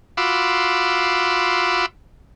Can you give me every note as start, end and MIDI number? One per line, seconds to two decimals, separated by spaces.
0.17 1.86 65
0.17 1.86 66
0.17 1.86 83
0.17 1.86 84
0.17 1.86 86
0.17 1.86 88